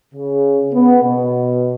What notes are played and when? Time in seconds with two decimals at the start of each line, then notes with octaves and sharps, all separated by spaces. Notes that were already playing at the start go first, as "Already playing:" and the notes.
0.15 C#3
0.74 B3
1.03 B2